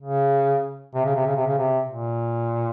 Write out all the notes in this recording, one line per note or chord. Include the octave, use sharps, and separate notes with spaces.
C#3
C3
C#3
C3
C#3
C3
C#3
C3
A#2